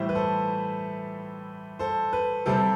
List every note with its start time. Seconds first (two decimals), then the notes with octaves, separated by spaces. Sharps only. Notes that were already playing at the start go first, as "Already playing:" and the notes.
Already playing: A2 E3 G3 C5 E5
0.09 B4
0.15 A4 C5
1.79 A4 C5
2.13 B4
2.46 C3 G3 C4 A4